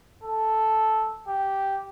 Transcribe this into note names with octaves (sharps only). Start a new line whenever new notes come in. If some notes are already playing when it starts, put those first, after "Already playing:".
A4
G4